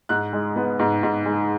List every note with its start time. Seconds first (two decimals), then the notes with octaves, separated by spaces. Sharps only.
0.09 G#2 F#6
0.33 G#3
0.56 B3
0.79 G#2
1.03 G#2
1.25 G#3